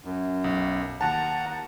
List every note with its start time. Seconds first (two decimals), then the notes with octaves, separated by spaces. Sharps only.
0.05 F#2
0.44 B1
1.01 D#2 F#5 A5 A#5